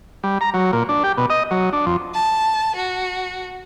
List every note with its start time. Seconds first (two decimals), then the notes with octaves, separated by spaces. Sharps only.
0.24 G3
0.41 A#5
0.54 F#3
0.73 A#2
0.89 D4
1.04 G4
1.17 B2
1.30 D#5
1.51 F#3
1.73 D4
1.86 F2
2.15 A5
2.76 F#4